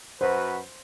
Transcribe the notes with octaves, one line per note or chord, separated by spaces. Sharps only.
F#2 F#4 B4 C5